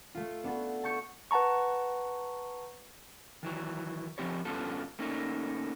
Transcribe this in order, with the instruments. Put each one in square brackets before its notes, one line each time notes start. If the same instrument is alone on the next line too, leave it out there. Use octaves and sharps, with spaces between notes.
[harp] A3 F4
B3 D4 F#4 A4
A5 C#6 G6 C#7
[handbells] B4 F#5 A5 A#5 C#6
[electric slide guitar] D#3 E3 F#3
F3 C4 G4 C#5
G2 B3 C#4 F4 A4
A3 A#3 C#4 D#4